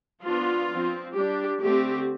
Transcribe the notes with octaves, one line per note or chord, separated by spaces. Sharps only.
F3 B3 D4 F4
F3 C4
G3 D4 G4
D3 A3 C4 G4